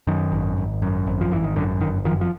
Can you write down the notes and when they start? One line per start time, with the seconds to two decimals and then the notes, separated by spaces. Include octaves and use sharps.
0.07 F#2 D#3
0.32 G#1
0.57 G#1
0.82 F#2
1.07 G#1
1.21 F3
1.31 G#1 E3
1.44 D#3
1.56 F#2 D3
1.80 G1 D#3
2.05 F#2 D#3 F3
2.21 F3